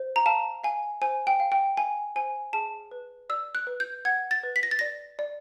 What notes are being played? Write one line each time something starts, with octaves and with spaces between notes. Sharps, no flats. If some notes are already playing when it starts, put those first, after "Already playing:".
Already playing: C5
A#5
F5 A5
F5 G#5
C5 G#5
G5
F5
G5
F5 G#5
C5 G#5
G#4 A5
B4
D5 E6
F#6
B4
G6
F#5 G#6
A6
B4
B6
A#6
A6
D5 A#6
D5